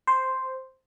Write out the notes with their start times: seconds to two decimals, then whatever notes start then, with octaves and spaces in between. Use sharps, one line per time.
0.07 C5